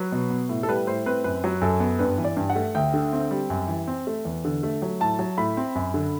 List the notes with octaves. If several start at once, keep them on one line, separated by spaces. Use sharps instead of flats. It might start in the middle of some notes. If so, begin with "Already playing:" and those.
Already playing: F#3 B4
B2
B3
A2
A4
G3 B4
A2 C5
C4 B4
F#2 B4
F#3
F#2 A4
B3
G2 B4
E3
D5
G2
F#5
A3
D2 G5
D3
C4
G3
F#2
E3
C4
A3
E2
D3
A3
F#3
A2 A5
F#3
A2 B5
C4
F#2
D3